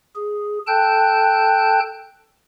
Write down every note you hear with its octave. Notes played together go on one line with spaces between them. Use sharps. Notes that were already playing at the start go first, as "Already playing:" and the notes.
G#4
A4 G5 A5 F#6 G6